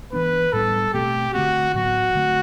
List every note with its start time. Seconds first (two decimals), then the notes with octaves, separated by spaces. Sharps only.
0.13 E3 B3 D4 B4
0.53 A2 G3 B3 D4 A4
0.94 B2 A3 C4 G4
1.34 D3 A3 C4 F#4
1.74 A2 F#3 B3 F#4
2.15 D3 A3 C4